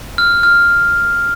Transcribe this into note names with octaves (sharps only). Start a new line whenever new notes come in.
F6
F6